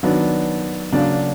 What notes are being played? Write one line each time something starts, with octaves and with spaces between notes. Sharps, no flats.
D#3 F#3 B3 D4
C#3 F#3 A#3 D4